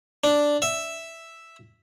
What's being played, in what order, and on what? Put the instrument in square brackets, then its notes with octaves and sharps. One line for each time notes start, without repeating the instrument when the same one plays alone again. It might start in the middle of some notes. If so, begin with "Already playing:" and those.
[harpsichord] D4
E5